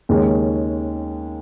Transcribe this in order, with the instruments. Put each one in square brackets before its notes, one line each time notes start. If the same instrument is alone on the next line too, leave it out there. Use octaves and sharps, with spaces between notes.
[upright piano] D#2 C#3 G#3 C#4